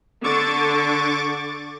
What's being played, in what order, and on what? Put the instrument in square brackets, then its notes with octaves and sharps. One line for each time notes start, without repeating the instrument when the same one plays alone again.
[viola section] D3 [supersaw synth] C#6 D6 A6